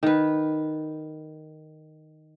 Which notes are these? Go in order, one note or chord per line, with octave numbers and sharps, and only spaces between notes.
D#3 B4